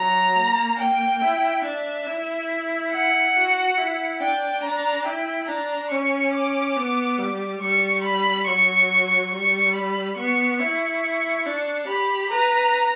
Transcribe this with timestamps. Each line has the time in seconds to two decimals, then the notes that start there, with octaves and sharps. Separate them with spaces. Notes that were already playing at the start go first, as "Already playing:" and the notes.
Already playing: F#3 A#5
0.36 A#3
0.79 G5
1.21 E4
1.65 D4 E5
2.07 E4
2.92 F#5
3.35 F#4
3.78 E4
4.20 D4 G5
4.63 D4 A#5
5.06 E4 G5
5.48 D4 A#5
5.91 C#4 C#6
6.34 D6
6.76 B3
7.19 G3
7.61 G3 C#6
8.04 B5
8.47 F#3 C#6
9.32 G3 C#6
9.74 B5
10.17 B3 C#6
10.60 E4 C#6
11.46 D4
11.87 G4 B5
12.31 B4 A#5